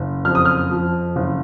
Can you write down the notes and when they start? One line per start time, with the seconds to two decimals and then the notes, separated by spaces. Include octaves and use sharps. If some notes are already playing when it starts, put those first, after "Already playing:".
Already playing: F#1
0.25 F2 F6
0.35 D#6
0.45 F6
0.71 F3
1.16 F#1